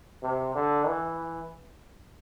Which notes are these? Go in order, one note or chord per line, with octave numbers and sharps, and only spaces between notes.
C3
D3
E3